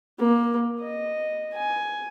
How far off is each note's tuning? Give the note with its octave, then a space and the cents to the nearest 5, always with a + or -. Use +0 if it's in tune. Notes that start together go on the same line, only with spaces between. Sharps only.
A#3 +20
D#5 -10
G#5 +10